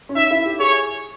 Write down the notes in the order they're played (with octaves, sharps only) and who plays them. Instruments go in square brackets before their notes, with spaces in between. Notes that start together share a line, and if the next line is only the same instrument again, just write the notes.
[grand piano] C#4
[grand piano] D#4 [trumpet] E5
[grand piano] E4
G4
[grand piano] G#4 [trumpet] C#5